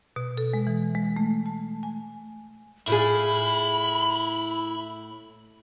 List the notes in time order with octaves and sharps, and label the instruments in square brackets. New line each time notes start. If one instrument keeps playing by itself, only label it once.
[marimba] B2
A4
G#3
E3
G#3
A3
A5
G#5
[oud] A2 F4 G#4 [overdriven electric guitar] E4 [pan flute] B5